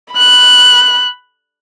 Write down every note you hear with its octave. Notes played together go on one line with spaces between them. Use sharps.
B5 F#6